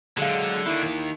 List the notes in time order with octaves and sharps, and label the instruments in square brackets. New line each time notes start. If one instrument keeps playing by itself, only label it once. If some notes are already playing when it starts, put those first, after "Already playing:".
[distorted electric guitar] D3 [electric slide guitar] F#3 G#3 [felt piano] G#4 F5
[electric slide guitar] D#3 A#3 [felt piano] E4 E5